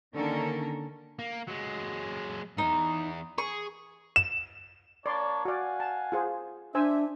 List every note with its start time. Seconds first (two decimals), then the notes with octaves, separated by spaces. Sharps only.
0.15 D3 D#3 A#3 C#4 A4 A#4
1.19 A#3
1.48 F#3 G#3
2.58 E2 G#2 D#4
3.38 G#4 C#6
4.16 E7
5.06 A#3 D4 C#5 D5 C6
5.45 F#4 D5 F5 F#5 G#5
5.80 A5
6.12 F4 G#4 C5
6.75 D4 C5 E5 G#5 E6